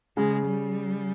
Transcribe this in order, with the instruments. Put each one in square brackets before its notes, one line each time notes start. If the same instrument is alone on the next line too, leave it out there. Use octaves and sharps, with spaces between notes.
[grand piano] C#3 [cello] G#3
[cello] G3